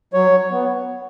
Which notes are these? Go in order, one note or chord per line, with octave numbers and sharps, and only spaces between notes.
F#3 C#5
B3